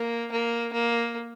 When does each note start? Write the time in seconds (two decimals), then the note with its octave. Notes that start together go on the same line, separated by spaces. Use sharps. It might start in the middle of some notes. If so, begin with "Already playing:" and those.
Already playing: A#3
0.32 A#3
0.73 A#3